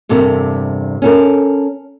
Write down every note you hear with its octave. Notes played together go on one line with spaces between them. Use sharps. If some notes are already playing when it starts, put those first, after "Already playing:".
E2 G2 C3 A4 A#4
C#4 A4 A#4